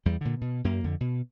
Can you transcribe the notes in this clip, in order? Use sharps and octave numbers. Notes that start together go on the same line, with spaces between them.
E2 G3
A#2 D3
B2
F#2 A#3
F2 D3
B2